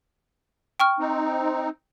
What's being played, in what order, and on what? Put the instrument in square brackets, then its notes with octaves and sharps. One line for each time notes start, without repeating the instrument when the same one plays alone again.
[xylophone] G5 C#6 F6
[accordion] C4 D#4